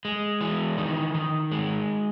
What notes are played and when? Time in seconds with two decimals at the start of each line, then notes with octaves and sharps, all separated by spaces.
0.05 G#3
0.41 E3
0.78 D#3
1.15 D#3
1.52 G#3